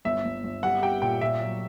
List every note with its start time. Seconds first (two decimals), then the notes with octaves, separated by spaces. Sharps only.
0.05 G1 E5
0.25 G1
0.44 G1
0.63 G3 F#5
0.82 G4 G5
1.02 A#2 G5
1.21 A#2 E5
1.40 F#3